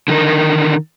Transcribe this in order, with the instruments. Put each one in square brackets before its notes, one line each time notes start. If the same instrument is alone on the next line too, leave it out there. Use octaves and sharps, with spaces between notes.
[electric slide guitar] D3 D#3 A#4